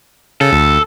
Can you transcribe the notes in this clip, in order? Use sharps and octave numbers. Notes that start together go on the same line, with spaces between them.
C#3 A4
D2